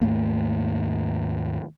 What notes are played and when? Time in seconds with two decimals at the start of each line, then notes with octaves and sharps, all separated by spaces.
0.01 D#2 G#2 A3 A#3